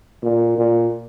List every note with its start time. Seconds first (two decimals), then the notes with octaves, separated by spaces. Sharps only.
0.23 A#2
0.58 A#2